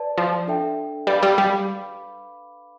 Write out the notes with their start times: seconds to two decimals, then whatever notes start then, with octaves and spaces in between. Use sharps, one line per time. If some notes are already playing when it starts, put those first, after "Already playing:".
Already playing: B4 D5 A5
0.18 F3
0.47 D4 A4 E5 G5
1.07 G3 B4 F5 B5 D6
1.23 G3
1.38 G3